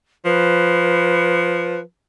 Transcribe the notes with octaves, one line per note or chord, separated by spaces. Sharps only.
F3 B4